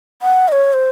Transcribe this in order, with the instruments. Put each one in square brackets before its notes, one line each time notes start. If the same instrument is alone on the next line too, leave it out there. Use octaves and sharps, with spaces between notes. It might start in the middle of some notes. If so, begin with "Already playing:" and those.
[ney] F#5
D#5
C#5
C5